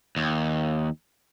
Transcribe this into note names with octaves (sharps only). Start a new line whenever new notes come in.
D#2